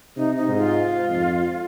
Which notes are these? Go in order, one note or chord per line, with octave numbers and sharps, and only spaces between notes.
C3 D#4
D#4
G#2
F4
F2